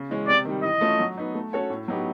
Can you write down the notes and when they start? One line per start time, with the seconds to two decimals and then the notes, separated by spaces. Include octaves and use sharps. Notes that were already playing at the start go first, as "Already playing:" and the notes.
Already playing: C#3
0.09 E3 G#3 C#4
0.28 C3 D5
0.45 D#3 G3
0.63 E3 D#5
0.81 A3 C#4 F4
1.00 F#3
1.17 B3 D#4
1.34 A3
1.53 C#4 F#4 A4 C#5
1.70 A2
1.88 F#3 B3 D#4 G4